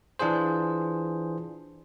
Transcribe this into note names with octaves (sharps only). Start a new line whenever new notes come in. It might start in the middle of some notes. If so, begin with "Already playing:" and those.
E3 D4 F4 G#4 C5